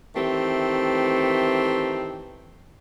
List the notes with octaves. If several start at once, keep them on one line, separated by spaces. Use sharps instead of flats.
D#3 E3 A3 C4 G4